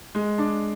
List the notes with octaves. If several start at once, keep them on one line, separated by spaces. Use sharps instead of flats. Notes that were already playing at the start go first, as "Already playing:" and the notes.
G#3
D4